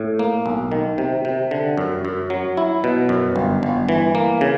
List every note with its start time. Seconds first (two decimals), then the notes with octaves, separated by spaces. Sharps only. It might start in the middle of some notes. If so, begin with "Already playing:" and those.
Already playing: A2
0.19 A#3
0.46 B1
0.72 D#3
0.98 C3
1.25 C3
1.51 D3
1.77 F#2
2.05 F#2
2.30 F#3
2.57 E4
2.84 B2
3.09 F#2
3.36 G1
3.63 G1
3.89 E3
4.15 A#3
4.41 C#3